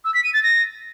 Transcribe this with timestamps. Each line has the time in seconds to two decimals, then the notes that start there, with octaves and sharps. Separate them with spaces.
0.05 E6
0.14 B6
0.24 D#7
0.34 A6
0.43 A#6